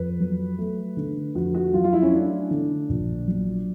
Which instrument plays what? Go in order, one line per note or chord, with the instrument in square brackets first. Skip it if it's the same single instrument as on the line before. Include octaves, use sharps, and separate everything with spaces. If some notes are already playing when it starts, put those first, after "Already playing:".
Already playing: [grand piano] F2 [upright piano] B4
[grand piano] F#3
A3
D3
[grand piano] F2 [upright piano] F#4
[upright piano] F#4
[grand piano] F#3 [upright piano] F4
[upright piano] F4
E4
C#4
[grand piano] A3 [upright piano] D4
[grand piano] D3
A#1
F#3